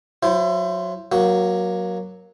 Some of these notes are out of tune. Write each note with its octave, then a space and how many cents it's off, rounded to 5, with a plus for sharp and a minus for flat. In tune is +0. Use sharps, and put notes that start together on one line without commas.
F#3 -20 E4 +35 C5 +0
F#3 +0 A#3 +15 F#4 +0